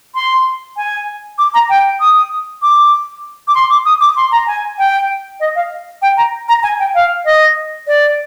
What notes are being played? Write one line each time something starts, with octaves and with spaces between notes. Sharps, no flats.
C6
G#5
D6
A#5
G5
D#6
D6
D6
C6
D6
D#6
D6
C6
A#5
G#5
G5
D#5
F5
G5
A#5
A#5
G#5
G5
F5
D#5
D5